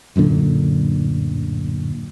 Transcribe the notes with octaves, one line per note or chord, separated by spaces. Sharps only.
D1 F#2 A#2 D3